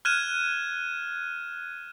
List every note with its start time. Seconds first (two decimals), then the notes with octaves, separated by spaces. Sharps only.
0.05 F6 F#6 G#6 D#7 E7